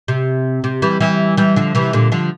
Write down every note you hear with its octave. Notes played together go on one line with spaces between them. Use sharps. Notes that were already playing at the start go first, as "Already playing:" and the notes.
C3
C3
E3 G3
E3 G3
E3 G3
D3 F3
C3 E3
A#2 D3
D3 F3